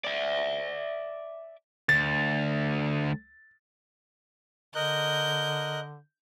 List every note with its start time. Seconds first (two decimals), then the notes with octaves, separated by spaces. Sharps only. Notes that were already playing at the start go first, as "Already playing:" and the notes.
0.04 D5 E5
1.89 D2 A6
4.75 D3 A#4 D#5 F#6 G6